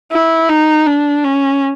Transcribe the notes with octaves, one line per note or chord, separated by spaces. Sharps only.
E4
D#4
D4
C#4